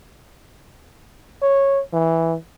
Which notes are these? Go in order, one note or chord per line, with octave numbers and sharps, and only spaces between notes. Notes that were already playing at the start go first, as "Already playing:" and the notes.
C#5
E3